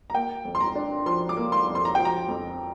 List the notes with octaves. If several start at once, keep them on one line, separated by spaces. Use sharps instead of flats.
A#5
A#3 G5
F2
C6
A#5
D4
F3 C6
D6
A#3
C6
F2
C6
A#5
F3 G5
A#5
F2